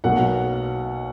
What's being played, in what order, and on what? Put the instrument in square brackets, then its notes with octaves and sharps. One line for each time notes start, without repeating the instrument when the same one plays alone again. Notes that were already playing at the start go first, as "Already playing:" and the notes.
[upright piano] B1 B2 A#3 F#5